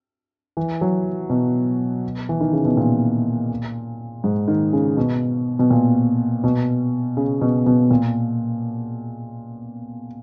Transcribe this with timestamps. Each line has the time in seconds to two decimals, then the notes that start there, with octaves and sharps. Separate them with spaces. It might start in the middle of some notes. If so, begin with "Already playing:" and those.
0.57 E3
0.81 F#3
1.30 B2
2.29 E3
2.41 D#3
2.53 C#3
2.65 B2
2.77 A#2
4.24 G#2
4.48 D#3
4.73 C#3
4.97 B2
5.59 B2
5.70 A#2
6.44 B2
7.17 C#3
7.41 B2
7.66 B2
7.91 A#2